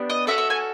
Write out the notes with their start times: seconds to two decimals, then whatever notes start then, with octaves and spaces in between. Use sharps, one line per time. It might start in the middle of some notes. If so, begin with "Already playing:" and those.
Already playing: B3 D4 G4
0.10 D#5
0.27 C#4 F#4 A4 E5
0.38 E5
0.50 G#5